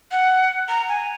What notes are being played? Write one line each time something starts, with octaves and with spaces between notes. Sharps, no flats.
F#5
A#5
G#5